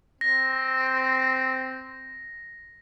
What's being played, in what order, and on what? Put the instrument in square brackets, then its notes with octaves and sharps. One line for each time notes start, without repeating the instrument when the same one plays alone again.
[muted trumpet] C4 [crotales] A#6